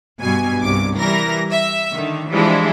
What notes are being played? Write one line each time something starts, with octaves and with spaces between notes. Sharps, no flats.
G2 B2 G#5
C2 G2 D6
E3 G3 A#4 A#6
E5
D3 D#3
E3 F3 G3 G#3 D4 E4